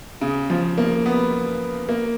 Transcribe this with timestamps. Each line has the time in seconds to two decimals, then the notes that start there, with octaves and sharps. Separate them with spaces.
0.21 C#3
0.50 F3
0.78 A#3
1.06 B3
1.89 A#3